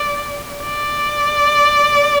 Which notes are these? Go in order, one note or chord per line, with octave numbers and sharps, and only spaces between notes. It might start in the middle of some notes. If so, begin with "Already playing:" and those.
Already playing: D5
D5